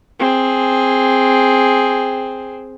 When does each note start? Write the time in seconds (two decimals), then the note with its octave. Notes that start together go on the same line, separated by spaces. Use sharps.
0.19 C4 G#4